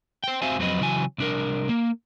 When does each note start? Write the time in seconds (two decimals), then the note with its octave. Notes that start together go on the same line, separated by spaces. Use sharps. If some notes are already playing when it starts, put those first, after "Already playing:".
0.24 C5 G5
0.42 C4 F#4 C5 E5 F5 G#5
0.59 F2 F#3 C4 B4 D#5
0.81 C#3 E3 F#3 G#5
1.18 C2 D4 A#4
1.69 A#3